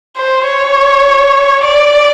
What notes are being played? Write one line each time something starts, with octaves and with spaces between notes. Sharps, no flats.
C5
C#5
D5